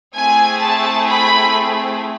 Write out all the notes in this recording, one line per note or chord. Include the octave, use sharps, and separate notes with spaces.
A3 C4 E4 G#4 G#5
A5
B5